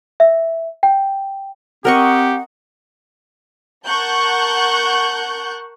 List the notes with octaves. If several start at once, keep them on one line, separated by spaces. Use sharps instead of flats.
E5
G5
C4 G4 A#4 D#5 F#5 C#6
A#4 F#5 A5 C#6 F#6 G6